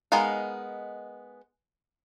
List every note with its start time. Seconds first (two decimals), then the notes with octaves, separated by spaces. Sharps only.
0.12 G#3 B3 D#4 A#4 F5